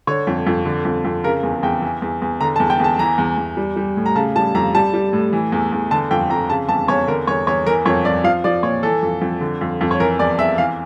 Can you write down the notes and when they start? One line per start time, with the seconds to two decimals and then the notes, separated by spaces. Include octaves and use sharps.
0.07 D3 C#5
0.27 F2
0.47 F2
0.65 D3
0.85 F2
1.05 F2
1.24 C#3 A#4
1.43 E2
1.63 E2 G5
1.82 E3
2.02 E2
2.22 E2
2.41 D3 A#5
2.56 A5
2.60 E2
2.70 G5
2.80 E2 A5
2.99 E3 A#5
3.18 E2
3.38 E2
3.57 G3
3.76 G3
3.97 A2
4.06 A#5
4.15 C#3 A5
4.36 G3 A5
4.55 F2 A#5
4.74 G3 A5
4.94 G3
5.13 A2
5.33 E3
5.52 E2
5.72 E2
5.91 D3 A5
6.11 F2 G5
6.29 F2 A#5
6.49 C#3 A5
6.69 E2 A5
6.88 E2 C#5
7.08 D3 A#4
7.27 E2 C#5
7.47 E2 C#5
7.67 E3 A#4
7.85 F2 C#5
8.05 F2 D5
8.24 F3 F5
8.44 F3 D5
8.63 A#2 C#5
8.83 E3 A4
9.02 F2
9.21 F2
9.41 D3
9.61 F2
9.81 F2
9.91 C#5
10.00 E3 A#4
10.19 E2 D5
10.38 E2 E5
10.58 E3 F5